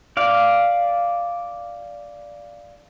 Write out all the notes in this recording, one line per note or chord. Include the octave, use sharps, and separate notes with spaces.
D5 F5